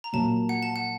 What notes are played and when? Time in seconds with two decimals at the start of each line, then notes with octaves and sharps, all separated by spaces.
0.04 A#5
0.13 A#2 F#3 A#3 A5
0.49 F#5
0.63 A5
0.76 F#5